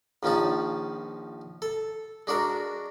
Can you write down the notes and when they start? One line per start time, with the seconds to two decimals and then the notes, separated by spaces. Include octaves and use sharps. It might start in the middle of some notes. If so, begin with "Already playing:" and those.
0.23 A#1 D#3 F3 C#4 A5
1.62 A4
2.27 G#3 D4 F#4 A#4